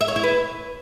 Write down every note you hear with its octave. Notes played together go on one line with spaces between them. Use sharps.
E5
C#5
E4
B4